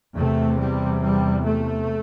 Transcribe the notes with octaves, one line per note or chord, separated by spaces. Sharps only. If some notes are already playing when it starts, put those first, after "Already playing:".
E2 C3 A3
G3
G3
A3